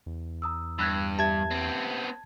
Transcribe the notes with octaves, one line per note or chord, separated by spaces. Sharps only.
E2
A#5 D#6 E6
G2 E6 F#6 G#6
G4 E5 A5 G#6
B3 C4